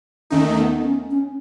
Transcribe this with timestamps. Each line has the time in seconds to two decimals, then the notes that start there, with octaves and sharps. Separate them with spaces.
0.30 D#2 D#3 A3 C#4 D#4
0.57 B3
0.84 C#4
1.11 C#4